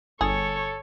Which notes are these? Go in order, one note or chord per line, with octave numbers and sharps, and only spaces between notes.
G1 G#4 A4 C#5